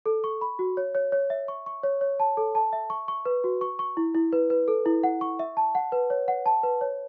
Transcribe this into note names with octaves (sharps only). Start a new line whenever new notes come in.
A4
C#6
B5
F#4
C#5
C#5
C#5
E5
C#6
C#6
C#5
C#5
A5
A4
A5
E5
C#6
C#6
B4
F#4
C#6
C#6
E4
E4
B4
B4
A4
E4
F#5
C#6
E5
A5
F#5
B4
C#5
F#5
A5
B4
C#5